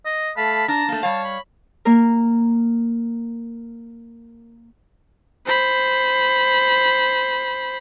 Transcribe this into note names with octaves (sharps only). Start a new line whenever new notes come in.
D#5
A3 F5 A5 B5
D4 A5 A#5
A3 A#3
G3 C#5 F5
B5
A#3 A#4
C5 B5